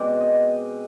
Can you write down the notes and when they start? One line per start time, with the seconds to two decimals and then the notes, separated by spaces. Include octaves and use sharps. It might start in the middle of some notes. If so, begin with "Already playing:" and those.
Already playing: B2 G#3 C4 D5
0.20 D#5